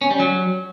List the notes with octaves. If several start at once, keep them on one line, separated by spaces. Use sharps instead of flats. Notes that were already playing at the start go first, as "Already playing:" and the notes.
C#4
G3
F#3